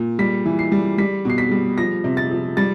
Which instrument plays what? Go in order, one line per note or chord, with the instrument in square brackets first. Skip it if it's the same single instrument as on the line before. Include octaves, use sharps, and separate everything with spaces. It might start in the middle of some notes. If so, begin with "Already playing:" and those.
Already playing: [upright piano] A#2
G3 B6
E3
C7
G3
G3 B6
B2 C7
B6
G3
F3 A#6
C3
A6
F3
G3 A6